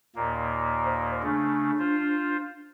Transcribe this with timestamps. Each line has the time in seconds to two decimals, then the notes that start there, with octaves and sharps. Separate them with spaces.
0.16 D#2 A#2 A#3
0.85 C5
1.23 C#3 A3 D4
1.79 F4 C5